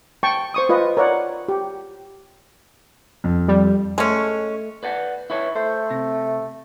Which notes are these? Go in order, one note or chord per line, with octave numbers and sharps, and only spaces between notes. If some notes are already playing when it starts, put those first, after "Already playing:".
G5 A5 C#6
C5 C#6 D#6
F4 B4 D#5
A#4 C#5 D5 F#5
G4
F2
G3
G#3 A3 C#4
B4 D5 F#5
E4 B4 C#5
A3 C5
C3